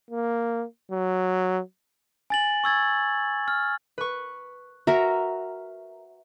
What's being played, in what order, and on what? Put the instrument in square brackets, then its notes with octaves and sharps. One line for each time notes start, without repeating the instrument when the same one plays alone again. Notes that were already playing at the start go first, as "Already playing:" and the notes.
[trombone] A#3
F#3
[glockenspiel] G#5 A6 F#7
C#6 E6 G#6 A6
F6
[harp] B4 C#6
[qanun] F#4 A#4 [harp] E5 A#5